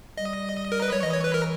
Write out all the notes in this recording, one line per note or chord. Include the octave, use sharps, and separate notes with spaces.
G3 D#5
A#4
B4
G3 C#5
E3 D#5
C#5
B4
A#4